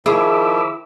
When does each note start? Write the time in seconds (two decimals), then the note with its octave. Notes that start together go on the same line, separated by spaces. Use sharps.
0.06 D#3 F3 E4 G#4 B5 D6 E6